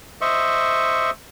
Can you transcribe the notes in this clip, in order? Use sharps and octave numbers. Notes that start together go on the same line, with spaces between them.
C5 D#5 E5 C#6